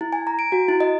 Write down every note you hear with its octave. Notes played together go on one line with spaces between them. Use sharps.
E4
G#5
A#5
D7
F#4
E4
D#5